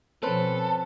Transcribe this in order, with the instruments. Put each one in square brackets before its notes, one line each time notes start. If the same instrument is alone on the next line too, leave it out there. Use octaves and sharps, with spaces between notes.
[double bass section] B2 F3 [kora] C4 C#4 B4 [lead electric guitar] A4